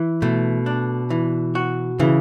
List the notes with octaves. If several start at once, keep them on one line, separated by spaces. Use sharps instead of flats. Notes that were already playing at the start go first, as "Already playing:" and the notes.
Already playing: E3
B2 A3
D4
E3
F#4
C#3 E3